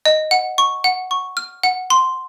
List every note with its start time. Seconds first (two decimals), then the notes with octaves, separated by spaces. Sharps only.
0.05 D#5
0.31 F#5
0.58 C#6
0.84 F#5
1.11 C#6
1.37 F6
1.63 F#5
1.90 C6